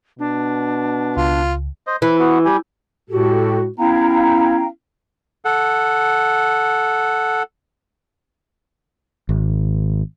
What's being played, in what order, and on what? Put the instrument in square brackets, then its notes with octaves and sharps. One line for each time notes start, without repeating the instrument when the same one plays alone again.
[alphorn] B2 [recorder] D4
[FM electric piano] C#2 [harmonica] F4
[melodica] C5 D#5
[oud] E3 [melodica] B4
[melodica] B3 F#4
G3 G4 G#5
[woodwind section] A2 G#3 F#4 [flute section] G4 A4
[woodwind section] B3 C#4 E4 [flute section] F5 G5 A#5
[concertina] A4 F#5
[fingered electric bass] G#1